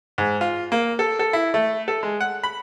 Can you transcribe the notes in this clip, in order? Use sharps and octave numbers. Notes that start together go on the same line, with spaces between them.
G#2
F4
A#3
A4
A4
E4
A3
A4
G#3
F#5
B5